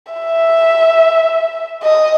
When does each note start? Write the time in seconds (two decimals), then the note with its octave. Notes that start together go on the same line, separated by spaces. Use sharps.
0.13 E5
1.83 D#5